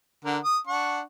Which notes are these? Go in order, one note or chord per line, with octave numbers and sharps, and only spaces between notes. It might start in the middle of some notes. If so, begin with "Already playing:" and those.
D3 A#4 F#5
D#6
D4 F#5 C#6